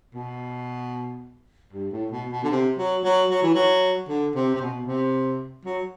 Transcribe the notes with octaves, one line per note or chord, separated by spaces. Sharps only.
B2
G2
A2
B2
B2
D3
C3
F#3
F#3
F#3
E3
F#3
D3
C3
C3
B2
C3
F#3